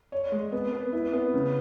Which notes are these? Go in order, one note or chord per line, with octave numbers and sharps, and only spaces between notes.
C#5
G#3
B3
B3
E4
B3
C#3